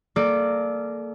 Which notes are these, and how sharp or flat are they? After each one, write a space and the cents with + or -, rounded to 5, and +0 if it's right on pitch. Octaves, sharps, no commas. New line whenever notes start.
A#3 -25 A4 -40 D5 +0